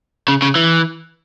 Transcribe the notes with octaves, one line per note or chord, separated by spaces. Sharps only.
C#3
C#3
E3